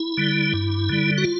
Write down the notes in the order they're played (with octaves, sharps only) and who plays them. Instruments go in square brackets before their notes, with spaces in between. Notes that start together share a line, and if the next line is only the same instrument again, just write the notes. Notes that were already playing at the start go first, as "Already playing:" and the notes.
Already playing: [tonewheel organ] E4
D3 G3
G2
D3 G3
F#4
F4